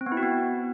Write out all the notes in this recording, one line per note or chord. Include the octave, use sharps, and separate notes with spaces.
C4
B3
E4
F#4
B3